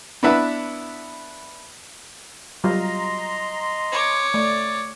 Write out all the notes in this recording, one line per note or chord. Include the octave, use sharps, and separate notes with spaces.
B3 D4 E4 B4 E5
F#3 G3 F4 D#5 A#5 C6
C#5 D6
A3 D5